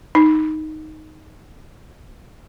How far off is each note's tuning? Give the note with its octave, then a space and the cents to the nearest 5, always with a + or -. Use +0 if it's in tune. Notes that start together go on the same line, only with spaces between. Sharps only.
D#4 +0